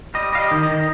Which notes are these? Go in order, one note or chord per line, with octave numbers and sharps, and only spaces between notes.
G3 D#5
G3 F5
D#5
D#3
D#5
D#3